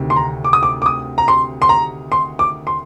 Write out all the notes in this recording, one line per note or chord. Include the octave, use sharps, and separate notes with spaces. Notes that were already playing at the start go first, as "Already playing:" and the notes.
Already playing: D2 C3 D#3
C6
A#5
D6
D#6
D6
D6
D#6
A#5
C6
C6
A#5
C6
D6
C6